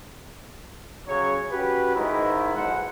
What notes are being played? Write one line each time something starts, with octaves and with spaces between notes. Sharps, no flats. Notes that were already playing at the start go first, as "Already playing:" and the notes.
C#3 F#3 C#5
C#4 F#4 G4 B4
G#2 D#3 E4
B1 E2 C5 F#5